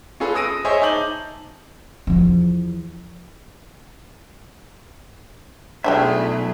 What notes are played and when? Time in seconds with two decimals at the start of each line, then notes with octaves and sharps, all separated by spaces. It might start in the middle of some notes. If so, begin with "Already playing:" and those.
0.20 C#4 F4 G#4 A4 B4
0.35 D#6 E6 A#6 D7 D#7
0.65 G#4 C5 C#5 D#5 E5 G#5
0.81 D#4 A5 D6 G6 F#7
2.07 E2 F3
5.84 B1 D3 G3 A3 G4 G#4 E5